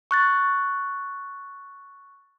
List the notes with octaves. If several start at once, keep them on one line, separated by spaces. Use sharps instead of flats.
C#6 F#6 A6